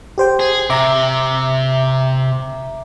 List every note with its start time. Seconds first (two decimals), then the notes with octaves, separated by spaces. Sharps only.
0.18 G4 C5 G5
0.40 G#4
0.70 C3 E5 A#5 D6